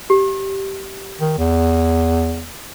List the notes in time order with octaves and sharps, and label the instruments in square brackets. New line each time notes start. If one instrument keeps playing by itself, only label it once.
[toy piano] G4
[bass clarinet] D#3
E2